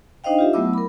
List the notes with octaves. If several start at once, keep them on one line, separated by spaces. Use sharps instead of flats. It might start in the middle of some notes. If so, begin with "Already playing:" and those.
D4 D#4 C5 D#5 F5 G5
F4 G4 E5
F#3 A3 B3 E4 D6 E6
A#4 B5